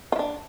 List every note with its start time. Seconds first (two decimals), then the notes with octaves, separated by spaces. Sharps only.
0.12 F4
0.16 E4
0.19 D4